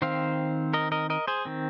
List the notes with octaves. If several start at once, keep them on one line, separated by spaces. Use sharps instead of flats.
D#3 C4 C5 F5
A#4 D#5
A#4 D#5
A#4 D#5
G#4 C5
D#3 C4